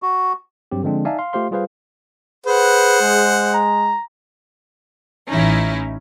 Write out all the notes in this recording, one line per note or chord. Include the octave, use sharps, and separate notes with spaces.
F#4
G2 F#3 C4 G4
D3 F3 G#3 C4 D4
D#4 D5 E5 F5 G#5 A5
F5 C6
A3 F4 G4 C5 F5 C6
G3 F4 G#4 B4 C5 F5
G#4 B4 C5 F#5
G#3
A#5
A1 E3 C#4 D#4 E4